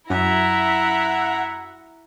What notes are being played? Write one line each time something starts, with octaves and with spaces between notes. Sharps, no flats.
F#2 E4 E5 F#5 A#5